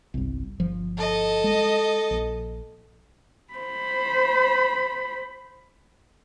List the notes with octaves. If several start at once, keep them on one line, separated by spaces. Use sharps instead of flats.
G1 C2
G1 F3
A4 D#5
G#3
A#1
C5 B5